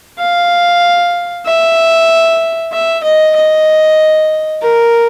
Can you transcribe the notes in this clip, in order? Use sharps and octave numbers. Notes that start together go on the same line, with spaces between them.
F5
E5
E5
D#5
D#5
A#4